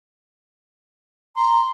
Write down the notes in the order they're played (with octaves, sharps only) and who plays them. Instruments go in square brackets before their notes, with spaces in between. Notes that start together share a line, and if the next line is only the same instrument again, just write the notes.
[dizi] A#5 [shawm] C6